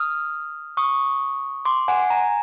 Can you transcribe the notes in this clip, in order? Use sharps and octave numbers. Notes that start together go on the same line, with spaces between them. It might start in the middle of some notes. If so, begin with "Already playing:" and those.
Already playing: D#6 F6
C#6 D#6
C6 D6
F#5 G#5
G#5 A#5